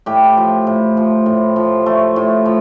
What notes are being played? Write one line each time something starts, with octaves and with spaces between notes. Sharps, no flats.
A2 G4
F3
A2
F3
A2
F3
A3
A2
F3